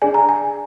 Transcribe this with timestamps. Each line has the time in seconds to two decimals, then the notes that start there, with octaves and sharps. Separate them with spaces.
0.02 D4 G#4 D5 G#5
0.14 A#5
0.29 G#5